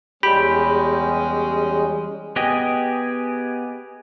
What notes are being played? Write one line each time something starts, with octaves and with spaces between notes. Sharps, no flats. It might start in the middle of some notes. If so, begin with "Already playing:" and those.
E2 G3 G#3 C#4 G4 B5
B3 G4 G#4 D#5